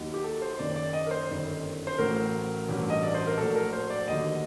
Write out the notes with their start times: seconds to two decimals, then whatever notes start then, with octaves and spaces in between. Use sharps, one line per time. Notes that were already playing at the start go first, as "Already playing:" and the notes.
Already playing: D#2 D#3 F#3
0.14 G4
0.24 A4
0.42 C5
0.59 F#1 F#2 D#3 D5
0.76 D5
0.93 D#5
1.06 A#4
1.11 C5
1.29 G1 F#2 D#3
1.87 C5
1.98 A1 A2 F#3 A#4
2.68 A1 G2 F#3
2.90 D#5
3.03 D5
3.14 C5
3.27 A#4
3.38 A#1 A2 F#3 A4
3.55 A#4
3.73 C5
3.90 D5
4.08 D#2 D3 F#3 D#5